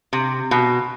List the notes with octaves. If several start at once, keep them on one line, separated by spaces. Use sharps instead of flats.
C3
B2